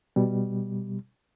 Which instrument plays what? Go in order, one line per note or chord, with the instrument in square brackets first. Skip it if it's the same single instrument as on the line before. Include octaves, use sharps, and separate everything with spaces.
[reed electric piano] B2 G3